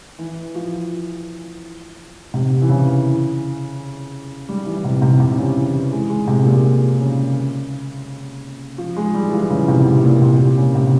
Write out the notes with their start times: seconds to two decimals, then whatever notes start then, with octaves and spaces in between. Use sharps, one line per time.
0.19 E3
0.55 F3
2.34 C3
2.62 E3
2.69 C#3
4.49 G3
4.67 E3
4.84 C3
5.02 C3
5.20 C3
5.38 C#3
5.57 E3
5.91 G#3
6.10 G#3
6.28 C3
6.45 A#2
7.00 C#3
8.78 F3
8.97 G#3
9.14 G3
9.29 E3
9.33 F3
9.42 E3
9.50 C#3
9.68 C3
9.86 C3
10.04 A#2
10.22 C3
10.39 A#2
10.58 C#3
10.75 C3